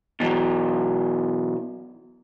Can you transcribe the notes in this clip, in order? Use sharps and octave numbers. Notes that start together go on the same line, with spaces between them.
B2 E3 F#3